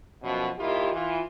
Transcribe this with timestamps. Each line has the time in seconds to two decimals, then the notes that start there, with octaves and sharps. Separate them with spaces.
0.22 F#2 B2 F3
0.58 D#2 D#3 E4 F4 G4
0.92 E3 F4